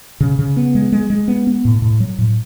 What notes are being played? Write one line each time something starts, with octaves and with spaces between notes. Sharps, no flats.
C#3
C#3
B3
G#3
G#3
G#3
B3
B3
A2
A2
F#3
A2